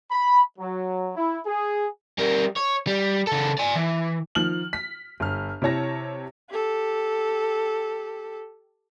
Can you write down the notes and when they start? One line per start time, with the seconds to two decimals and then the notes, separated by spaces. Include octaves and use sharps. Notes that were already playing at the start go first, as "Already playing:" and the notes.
0.11 B5
0.59 F#3
1.16 E4
1.46 G#4
2.18 G3 A#4
2.56 C#5
2.87 G3
3.27 C#3 A4
3.58 D5 G#5
3.75 E3
4.35 D#3 F3 F6 F#7
4.73 B6
5.20 G1 F6
5.62 C3 E4 G4 C#5 A5 A#6
6.50 G4 A4